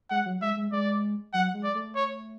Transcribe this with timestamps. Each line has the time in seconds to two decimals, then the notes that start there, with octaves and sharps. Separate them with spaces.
0.11 G#3 F#5
0.26 F#3
0.41 G#3 E5
0.57 G#3
0.72 G#3 D5
1.33 F#3 F#5
1.54 G#3
1.64 D5
1.75 A3
1.96 C#5